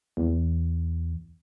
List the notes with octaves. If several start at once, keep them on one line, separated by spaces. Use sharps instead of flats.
E2